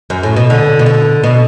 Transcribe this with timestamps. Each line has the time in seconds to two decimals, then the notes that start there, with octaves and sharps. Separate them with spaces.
0.10 F#2
0.23 A2
0.36 B2
0.50 D3
0.79 B2
0.86 D3
1.24 B2